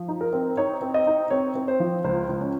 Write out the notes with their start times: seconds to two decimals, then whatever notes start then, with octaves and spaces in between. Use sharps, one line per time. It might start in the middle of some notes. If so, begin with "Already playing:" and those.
Already playing: F3
0.08 D#4
0.21 A#4
0.33 C4
0.57 D#4 C#5
0.81 C4
0.94 D#5
1.07 D#4
1.30 C4 C#5
1.55 C4
1.68 C5
1.80 F3
2.04 C#2 C5
2.29 C#2
2.41 C#4